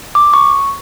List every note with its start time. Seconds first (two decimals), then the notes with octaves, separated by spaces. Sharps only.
0.15 D6
0.34 C#6